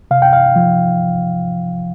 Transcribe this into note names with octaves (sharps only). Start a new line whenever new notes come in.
C3 F5
G5
F5
F3